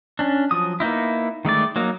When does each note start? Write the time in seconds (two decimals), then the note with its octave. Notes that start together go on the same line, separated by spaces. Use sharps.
0.19 C#4 D4
0.51 F3 F#3 D#6
0.80 A#3 B3 D#4 E4
1.45 D#3 G#3 A3 D5
1.76 F#3 A#3 D#4